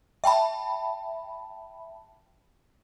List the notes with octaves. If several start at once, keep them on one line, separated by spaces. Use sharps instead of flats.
E5 G5 A5 B5